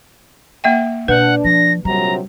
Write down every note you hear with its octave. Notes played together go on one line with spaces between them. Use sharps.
A#3 E5 G5
B2 D4 B4 F#5
F3 A#6
A#1 C3 F#3 G3 A#5